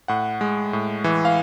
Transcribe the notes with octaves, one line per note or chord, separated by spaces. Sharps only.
A2 F#5
G#3
A2
E3
F5